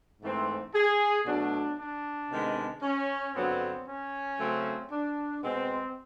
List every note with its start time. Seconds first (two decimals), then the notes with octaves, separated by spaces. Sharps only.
0.22 G#2 E3 A3 C4
0.74 G#4
1.26 B2 F#3 A3 D4
1.79 D4
2.30 C3 D#3 G#3 B3
2.83 C#4
3.34 G2 D3 F#3 B3 C4
3.87 C#4
4.39 C#3 F#3 A3 C4
4.92 D4
5.43 B2 G#3 B3 C4